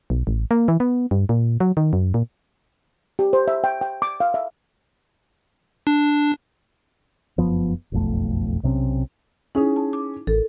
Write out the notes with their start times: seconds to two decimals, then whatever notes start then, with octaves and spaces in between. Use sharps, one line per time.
0.10 B1
0.27 A1
0.51 A#3
0.68 E3
0.80 B3
1.11 G2
1.29 A#2
1.60 F#3
1.77 D#3
1.93 F#2
2.14 A#2
3.19 G4
3.33 C5
3.48 E5
3.64 G5
3.81 G5
4.02 D6
4.20 F5
4.34 E5
5.87 D4
7.38 F1 F#2 F3 B3
7.92 F#1 B1 F2 A3
8.63 B1 C3 C4 C#4
9.55 C#4 D#4 E4 G#4
9.76 A5
9.93 D6
10.27 A1 A4 A#4